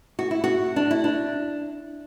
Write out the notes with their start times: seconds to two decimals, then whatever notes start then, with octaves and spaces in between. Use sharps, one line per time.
0.19 F#4
0.31 E4
0.44 F#4
0.76 D4
0.91 E4
1.04 D4